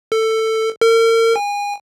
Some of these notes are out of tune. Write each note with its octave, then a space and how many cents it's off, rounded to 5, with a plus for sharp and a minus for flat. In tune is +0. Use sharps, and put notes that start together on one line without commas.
A4 +15
A#4 -40
G#5 -30